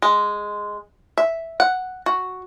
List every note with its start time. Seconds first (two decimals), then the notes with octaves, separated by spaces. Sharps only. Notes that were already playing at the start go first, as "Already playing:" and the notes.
0.02 G#3
1.17 E5
1.60 F#5
2.06 F#4